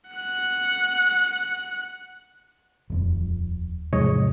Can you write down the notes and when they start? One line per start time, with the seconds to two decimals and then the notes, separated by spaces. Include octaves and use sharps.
0.10 F#5 F#6
2.90 D#1 F2 F3
3.93 E2 G#2 C3 F3 C#5 D#5